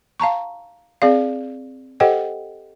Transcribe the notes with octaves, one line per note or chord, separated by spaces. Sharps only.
F5 A5 A#5 C#6
C4 G#4 D5 F5
G4 A4 C5 D#5 F#5 G5